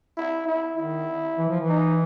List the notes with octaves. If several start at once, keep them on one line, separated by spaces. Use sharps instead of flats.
E4
E4
D#3 E4
E3
F3
E3
D#4